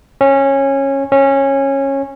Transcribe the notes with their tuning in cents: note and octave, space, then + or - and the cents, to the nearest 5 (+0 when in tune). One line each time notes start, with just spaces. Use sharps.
C#4 -15
C#4 -15